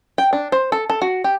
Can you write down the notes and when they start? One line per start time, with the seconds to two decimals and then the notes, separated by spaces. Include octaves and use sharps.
0.18 G5
0.33 D4
0.52 C5
0.72 A4
0.90 A4
1.02 F#4
1.24 G4